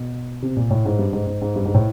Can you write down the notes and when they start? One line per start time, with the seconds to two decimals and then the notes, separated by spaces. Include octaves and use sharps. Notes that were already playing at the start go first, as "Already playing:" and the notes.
Already playing: B2
0.42 C3
0.57 A#2
0.71 A2
0.85 G#2
0.99 G2
1.13 G#2
1.27 G#2
1.41 G#2
1.56 G2
1.65 G#2
1.74 A2